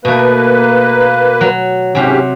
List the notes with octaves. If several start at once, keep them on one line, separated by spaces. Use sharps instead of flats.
B2 A3 A#3 B4
F#3
G#2 C3 F#3 C#4 G4